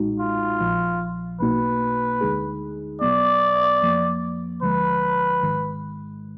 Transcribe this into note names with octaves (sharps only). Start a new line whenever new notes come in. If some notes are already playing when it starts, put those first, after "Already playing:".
Already playing: B1 A#2 G#3 D#4 F#4
F4
A#1 A#2 F3
B1 B2 A#3 D#4 F#4 B4
D2 D3 G#3 D#4 G#4
B1 B2 F#3 B3 D5
F2 F3 A#3
D2 D3 F3 G#3 B4
G#1 G#2 D#3 G#3